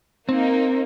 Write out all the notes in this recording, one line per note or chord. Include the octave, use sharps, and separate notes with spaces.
A#3 C4 D#4